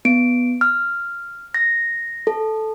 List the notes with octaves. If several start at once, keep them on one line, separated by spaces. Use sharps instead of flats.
B3 D7
F6
A#6
A4